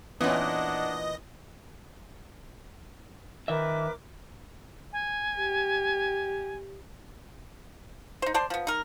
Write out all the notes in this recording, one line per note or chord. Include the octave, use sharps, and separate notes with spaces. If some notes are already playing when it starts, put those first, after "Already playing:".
A#2 E3 B3 C#4 D4 D#5 F#5
D#3 A#4 B4 E5 D6
G#5
G4
D#4 C5
C5 D5 A5 C6
F3 B3
D#4 A#4